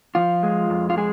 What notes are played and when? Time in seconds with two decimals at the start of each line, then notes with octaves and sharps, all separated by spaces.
0.15 F3 F4
0.43 G#3
0.70 F2
0.90 F4
0.97 G#3 G#4